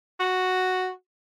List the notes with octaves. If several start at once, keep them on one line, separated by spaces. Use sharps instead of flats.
F#4